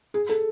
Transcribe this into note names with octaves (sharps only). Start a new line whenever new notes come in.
G#4
A4